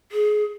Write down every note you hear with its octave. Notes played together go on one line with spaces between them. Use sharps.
G#4